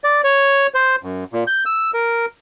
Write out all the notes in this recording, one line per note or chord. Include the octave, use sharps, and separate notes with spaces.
D5
C#5
C5
F#2
A#2
G6
E6
A#4